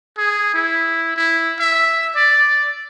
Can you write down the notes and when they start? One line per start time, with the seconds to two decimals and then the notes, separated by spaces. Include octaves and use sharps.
0.18 G#4
0.54 E4
1.16 E4
1.60 E5
2.16 D5